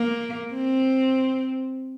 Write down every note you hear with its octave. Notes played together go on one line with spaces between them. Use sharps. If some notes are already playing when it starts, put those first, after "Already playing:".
Already playing: A#3
C4